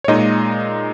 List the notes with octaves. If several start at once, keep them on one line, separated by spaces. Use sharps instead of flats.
C#5
A#2 G#3 D#4 D#5